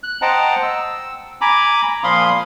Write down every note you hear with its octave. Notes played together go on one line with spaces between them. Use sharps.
F#6
C5 D#5 F#5 G5 A5 A#5
E6
G#5 A#5 B5 D6
A#2 F3 F5 B5 C6 D#6